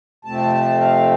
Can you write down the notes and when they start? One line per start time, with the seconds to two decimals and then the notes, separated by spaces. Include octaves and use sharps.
0.25 F2 C3 F3 A3 C4 A5
0.81 F5